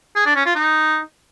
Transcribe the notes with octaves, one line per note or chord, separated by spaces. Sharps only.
G#4
D4
C#4
F4
D#4